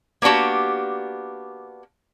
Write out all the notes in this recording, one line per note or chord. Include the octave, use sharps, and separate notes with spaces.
A#3 B3 D4 F#4 G4